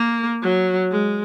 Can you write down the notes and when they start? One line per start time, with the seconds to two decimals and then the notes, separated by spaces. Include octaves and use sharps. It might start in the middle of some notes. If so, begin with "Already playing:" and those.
Already playing: A#3
0.43 F#3
0.91 G#3